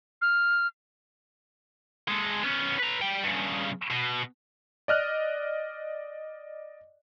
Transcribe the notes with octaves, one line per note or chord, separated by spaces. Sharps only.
F6
G#3 A4
B3 C#4
B4 A#5
G3 G5
G2 C#3
B2
D5 D#5 F6 F#6